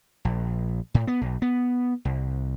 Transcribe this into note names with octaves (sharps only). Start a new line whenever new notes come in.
A#1
A2
B3
B1
B3
C2